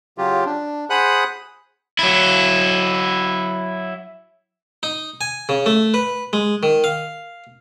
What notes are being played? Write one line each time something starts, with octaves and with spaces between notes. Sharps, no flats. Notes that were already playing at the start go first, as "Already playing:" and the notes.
C#3 F#3 F4 G4
D4
G#4 C5 F#5 B5 D#6 F#6
F#3 E4
D#4
G#5
C#3
A3
B4
G#3
D#3
F5